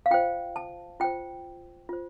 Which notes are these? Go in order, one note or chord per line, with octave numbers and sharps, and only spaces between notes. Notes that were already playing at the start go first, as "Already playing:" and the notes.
F5
F4 C5 G5
A5
F4 C5 G5
F4 C5